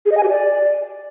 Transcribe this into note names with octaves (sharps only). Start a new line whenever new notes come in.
G#4
D#5
G#5
G4
D5